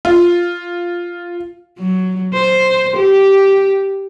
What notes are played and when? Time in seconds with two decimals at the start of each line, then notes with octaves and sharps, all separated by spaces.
0.05 F4
1.79 F#3
2.34 C5
2.96 G4